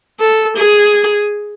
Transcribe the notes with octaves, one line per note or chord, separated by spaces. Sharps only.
A4
G#4